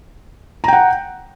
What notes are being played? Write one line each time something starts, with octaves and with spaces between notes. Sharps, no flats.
F#5 G5 A#5